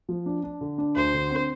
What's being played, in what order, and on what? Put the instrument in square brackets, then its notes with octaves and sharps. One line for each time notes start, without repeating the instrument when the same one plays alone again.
[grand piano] F3
D4
D4
D3
D4
[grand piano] D2 [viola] C5
[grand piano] D3
C4